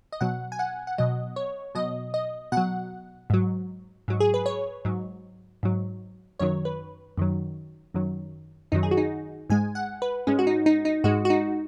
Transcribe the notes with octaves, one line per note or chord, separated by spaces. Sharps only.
D#5
B2 F#3 F#5
G#5
F#5
F#5
B2 F#3 D#5
C#5
B2 F#3 D#5
D#5
B2 F#5
F#3
G#2 F#3
G#2 F#3
G#4
B4
C#5
G#2 F#3
G#2 F#3
F#2 D#3 F#3 C#5
B4
F#2 D#3 F#3
F#2 D#3 F#3
F#2 D#3 F#3 D#4
G#4
F#4
D#4
G#2 G#3 G#5
F#5
B4
G#2 G#3 C#4
F#4
D#4
D#4
D#4
G#2 G#3 F#4
F#4
D#4